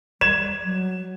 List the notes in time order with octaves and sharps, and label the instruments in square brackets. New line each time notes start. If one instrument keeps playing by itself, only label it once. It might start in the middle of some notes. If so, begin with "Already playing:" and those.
[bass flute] G3 [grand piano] G#6 E7
[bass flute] F#3